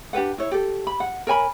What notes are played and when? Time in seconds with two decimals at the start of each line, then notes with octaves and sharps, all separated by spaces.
0.13 D4 G4 B4 F#5
0.38 E4 C#5
0.51 G4 A4
0.87 B5
1.00 F#5
1.27 A#4 C#5 G#5 B5